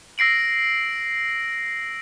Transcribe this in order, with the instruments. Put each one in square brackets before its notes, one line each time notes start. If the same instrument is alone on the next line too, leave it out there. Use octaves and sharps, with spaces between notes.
[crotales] E6 A#6 C7 D7 F#7